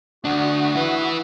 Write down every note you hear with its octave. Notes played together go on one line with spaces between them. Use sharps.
D2 D4 F#4 F#5 D#6
E4 B4